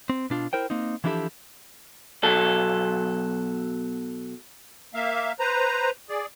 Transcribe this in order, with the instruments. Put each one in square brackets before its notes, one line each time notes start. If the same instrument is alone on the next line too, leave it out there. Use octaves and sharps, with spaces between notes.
[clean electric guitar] C4
B2 D4 F4
E4 A#4 C5 G5
A#3 C4 D#4
E3 F3 D4 E4 G4 A4
B1 B2 F#3 A4
[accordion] A#3 E5 F5
B4 C5 A#5
G#4 D5